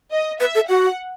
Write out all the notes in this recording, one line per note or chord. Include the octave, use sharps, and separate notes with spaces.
D#5
B4 E5
A4
F#4 F#5